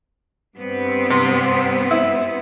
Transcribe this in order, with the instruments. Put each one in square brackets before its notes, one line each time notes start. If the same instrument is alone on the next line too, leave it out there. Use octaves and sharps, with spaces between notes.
[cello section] G2 B3 C4
[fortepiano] C3
E4